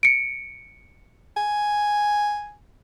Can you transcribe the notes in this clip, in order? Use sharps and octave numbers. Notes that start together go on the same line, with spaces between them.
C#7 D7
G#5